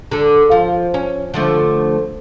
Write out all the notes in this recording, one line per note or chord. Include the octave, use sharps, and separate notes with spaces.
D3 A4
F3
C#4
D3 F3 A3